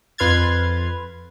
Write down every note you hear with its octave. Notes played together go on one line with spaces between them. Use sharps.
F2 B4 C6 F6 G#6 A6